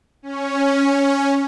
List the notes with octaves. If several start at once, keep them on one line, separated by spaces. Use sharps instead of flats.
C#4